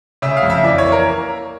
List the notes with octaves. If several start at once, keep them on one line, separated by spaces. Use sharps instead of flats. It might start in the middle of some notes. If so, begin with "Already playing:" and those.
C#3 E5
F5
F2
E5
E3 D5
C#5
A#3
A#4